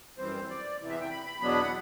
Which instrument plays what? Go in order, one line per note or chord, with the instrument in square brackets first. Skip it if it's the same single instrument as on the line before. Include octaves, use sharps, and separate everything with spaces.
[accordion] F#2 E3 G3 C4 C5
D5
E2 C3 E3
E5
G5
B5
B5
E2 B2 F#3 B3 D4 B5
F#5